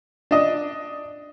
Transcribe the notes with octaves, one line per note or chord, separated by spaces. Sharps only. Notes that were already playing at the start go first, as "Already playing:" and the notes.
D4 D#5